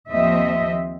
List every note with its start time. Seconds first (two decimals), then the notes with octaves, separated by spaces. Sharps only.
0.10 D#2 F3 C4 D#5 E5